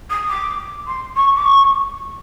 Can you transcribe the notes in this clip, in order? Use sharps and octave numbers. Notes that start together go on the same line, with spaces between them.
D#6
D6
C6
C#6
D6
C#6